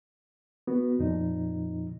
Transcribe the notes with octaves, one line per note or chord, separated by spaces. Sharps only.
B3 F#4
F2 A#2 F3 D#4